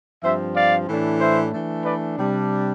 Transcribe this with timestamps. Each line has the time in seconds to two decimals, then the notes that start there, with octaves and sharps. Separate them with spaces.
0.23 G2 F3 C4 C5 E5
0.56 D5 F5
0.88 A2 E3 A3 D4
1.20 C5 E5
1.53 E3 A3 D4
1.85 B4 D5
2.18 C3 G3 D4